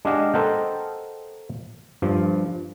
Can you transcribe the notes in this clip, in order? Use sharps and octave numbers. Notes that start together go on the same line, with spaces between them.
G#3 D4 G4 D#5 F5 F#5
A4 A#4 C5 D#5 F#5 G5
G2 F3